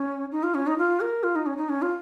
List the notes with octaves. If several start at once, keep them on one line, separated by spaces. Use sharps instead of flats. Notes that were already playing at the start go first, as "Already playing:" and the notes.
Already playing: C#4
D#4
F4
C#4
D#4
F4
A#4
F4
D#4
C#4
D#4
C#4
F4